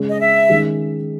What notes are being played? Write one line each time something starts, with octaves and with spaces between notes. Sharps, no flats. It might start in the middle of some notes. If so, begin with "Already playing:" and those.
Already playing: C#3 G#3 C#4
D#5
E5
D#3 G#3 C#4